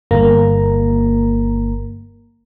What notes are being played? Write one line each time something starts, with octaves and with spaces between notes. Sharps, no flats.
G1 A#3 A#5